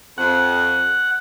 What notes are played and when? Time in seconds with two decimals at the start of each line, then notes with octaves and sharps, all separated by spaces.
0.18 F2 F#5